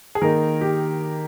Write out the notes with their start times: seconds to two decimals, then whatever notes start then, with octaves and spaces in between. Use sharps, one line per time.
0.15 G#4
0.22 D#3 A#3 D#4 A#4
0.61 G4